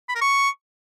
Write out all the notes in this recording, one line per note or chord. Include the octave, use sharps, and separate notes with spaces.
B5
A#4
C#6